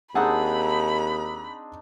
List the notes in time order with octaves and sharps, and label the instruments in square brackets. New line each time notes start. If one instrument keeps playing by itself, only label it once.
[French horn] D#2 [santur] C4 D4 D#4 [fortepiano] G#4 F#5 A5 [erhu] B5